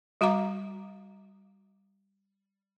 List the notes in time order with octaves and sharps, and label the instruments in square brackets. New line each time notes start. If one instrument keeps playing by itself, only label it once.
[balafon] G3 F#4 F5 A#5 D6